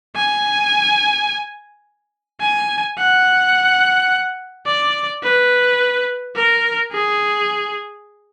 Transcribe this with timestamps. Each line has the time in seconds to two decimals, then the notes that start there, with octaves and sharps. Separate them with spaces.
0.16 G#5
2.40 G#5
2.98 F#5
4.66 D5
5.23 B4
6.35 A#4
6.92 G#4